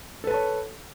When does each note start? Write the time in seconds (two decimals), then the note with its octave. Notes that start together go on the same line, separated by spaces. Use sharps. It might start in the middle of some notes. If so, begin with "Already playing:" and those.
0.24 A4
0.27 B4
0.31 A5
0.34 C#5